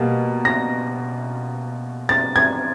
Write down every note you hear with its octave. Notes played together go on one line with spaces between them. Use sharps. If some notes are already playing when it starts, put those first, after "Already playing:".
Already playing: B2 G3 A#3
A#6
A6
G#6